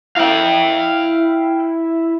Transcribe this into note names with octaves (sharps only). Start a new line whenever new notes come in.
E4 F5 G5